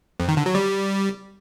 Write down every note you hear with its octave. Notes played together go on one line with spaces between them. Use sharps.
F2
D#3
D3
F#3
G3